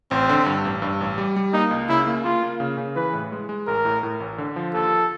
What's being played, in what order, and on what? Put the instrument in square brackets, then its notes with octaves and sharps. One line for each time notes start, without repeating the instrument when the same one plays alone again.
[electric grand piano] A1 [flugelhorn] C4
[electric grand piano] D3
G2
A1
G2
A1
G3
G3
[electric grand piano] A#3 [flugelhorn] D#4
[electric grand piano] C#2
[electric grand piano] C#3 [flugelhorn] E4
[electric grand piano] A#3
[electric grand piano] A#3 [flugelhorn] F4
[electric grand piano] A#3
C#3
C#3
[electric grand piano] E3 [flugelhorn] B4
[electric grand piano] A2
G#3
G#3
[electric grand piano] A1 [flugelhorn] A#4
[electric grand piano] A2
A2
A1
D3
F3
[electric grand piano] D#2 [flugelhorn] A4